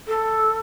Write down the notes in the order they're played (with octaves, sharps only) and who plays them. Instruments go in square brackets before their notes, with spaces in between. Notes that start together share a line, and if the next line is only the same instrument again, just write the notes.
[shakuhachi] A4